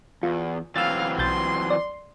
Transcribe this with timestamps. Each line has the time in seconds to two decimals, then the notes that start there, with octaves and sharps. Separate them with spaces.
0.23 E2 F4
0.76 E3 F#3 C4 F5 E6 A6
1.18 B1 C6 G6 A6
1.70 D5